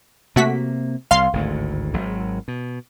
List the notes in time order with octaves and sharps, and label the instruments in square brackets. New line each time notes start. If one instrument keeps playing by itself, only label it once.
[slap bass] C3 A#3 [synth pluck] A3 F#4 B6
[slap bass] C2 [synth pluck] F5 C6
[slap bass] G#1 D2 A2
G#1 F#3
B2